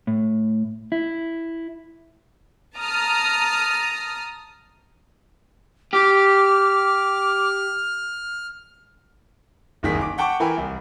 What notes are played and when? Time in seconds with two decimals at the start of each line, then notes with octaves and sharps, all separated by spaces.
0.07 A2
0.92 E4
2.77 A5 A#5 D#6 F6
5.93 G4 D6 F6
9.83 F#1 C2 D#3 G#4 B6
10.01 D6
10.18 F#5 G5 A5 C#6 D6
10.40 E3 E4 A#4 G5 G#5 B5
10.57 C2